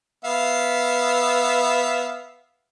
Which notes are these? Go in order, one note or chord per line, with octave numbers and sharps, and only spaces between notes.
B3 E5 F5